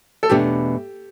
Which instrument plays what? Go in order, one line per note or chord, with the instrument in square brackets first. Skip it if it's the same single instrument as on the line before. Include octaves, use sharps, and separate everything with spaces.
[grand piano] A4
[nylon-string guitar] E2 B2 A3 D4 [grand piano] G4